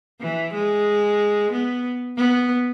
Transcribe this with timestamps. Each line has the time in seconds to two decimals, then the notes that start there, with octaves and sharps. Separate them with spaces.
0.21 E3
0.54 G#3
1.52 B3
2.17 B3